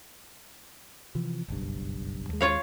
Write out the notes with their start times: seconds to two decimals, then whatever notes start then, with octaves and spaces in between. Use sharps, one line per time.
1.15 C3 E3 F3
1.48 F#1 B1 G2
2.29 D#2 G#3
2.41 F4 C#5 F5